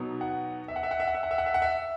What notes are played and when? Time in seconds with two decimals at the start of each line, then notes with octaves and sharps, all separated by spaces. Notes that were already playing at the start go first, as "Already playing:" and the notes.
Already playing: B2 F#3 B3 D#4
0.21 F#5
0.68 E5
0.76 F#5
0.83 E5
0.91 F#5
1.00 E5
1.07 F#5
1.15 E5
1.23 F#5
1.31 E5
1.38 F#5
1.46 E5
1.54 F#5
1.62 E5